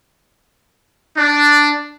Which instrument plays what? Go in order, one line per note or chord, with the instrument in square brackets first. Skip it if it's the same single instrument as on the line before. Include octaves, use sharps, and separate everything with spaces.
[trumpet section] D4